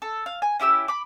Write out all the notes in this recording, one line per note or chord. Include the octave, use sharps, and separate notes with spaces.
A4
F5
G#5
C#4 E4 G4 E6
B5 D6